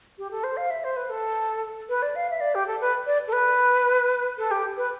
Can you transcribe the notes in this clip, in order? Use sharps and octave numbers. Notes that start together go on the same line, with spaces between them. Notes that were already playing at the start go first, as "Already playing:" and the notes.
G4
A4
C5
F5
E5
C5
B4
A4
B4
D5
F5
E5
D5
G4
A4
B4
D5
A4
B4
A4
G4
B4